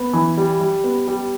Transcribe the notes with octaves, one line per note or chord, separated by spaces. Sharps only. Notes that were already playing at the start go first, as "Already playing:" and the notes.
Already playing: B3
E3
G3
G3
B3
G3